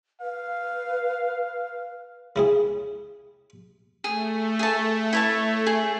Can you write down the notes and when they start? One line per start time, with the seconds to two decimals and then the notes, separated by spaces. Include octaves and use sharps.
0.21 B4 F5
2.36 C#3 E4 G#4
4.04 A3 G#4
4.59 G#4 A5
5.13 E4 C#5 A5
5.67 G#4